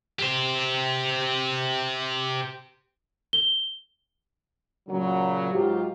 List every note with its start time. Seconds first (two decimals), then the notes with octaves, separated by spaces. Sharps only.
0.19 G4 C5
3.33 G7
4.88 A#2 C#3 F#3
5.52 G#2 F#3 F4 G4